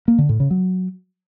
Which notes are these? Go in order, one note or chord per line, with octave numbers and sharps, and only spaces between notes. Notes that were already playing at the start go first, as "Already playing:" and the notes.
A#3
D3
A2
C#3
F#3